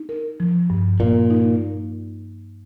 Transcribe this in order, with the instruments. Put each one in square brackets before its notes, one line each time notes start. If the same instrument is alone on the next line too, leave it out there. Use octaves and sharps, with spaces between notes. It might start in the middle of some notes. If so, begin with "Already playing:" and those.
Already playing: [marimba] D#4
A#4
F3
G2
[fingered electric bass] A#2 [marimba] A#3
[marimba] D#4